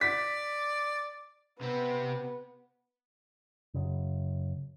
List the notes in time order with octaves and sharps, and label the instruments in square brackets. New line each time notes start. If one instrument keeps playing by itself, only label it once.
[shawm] D5 [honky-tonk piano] B6
[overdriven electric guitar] C3 C4 [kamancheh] B3
[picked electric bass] F#2 C#3